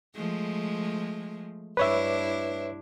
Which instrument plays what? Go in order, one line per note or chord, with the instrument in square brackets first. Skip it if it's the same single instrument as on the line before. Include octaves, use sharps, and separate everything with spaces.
[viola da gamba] F3 G#3 A3
[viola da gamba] G2 D4 E4 [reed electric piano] B4 C#5 E5